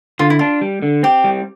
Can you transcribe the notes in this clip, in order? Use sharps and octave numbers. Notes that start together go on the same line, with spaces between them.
D3 F4
E4
D4 F4
G3
D3
C4 G4
G3